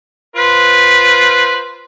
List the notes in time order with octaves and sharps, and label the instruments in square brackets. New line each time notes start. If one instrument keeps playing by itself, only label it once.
[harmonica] F4 B4 C5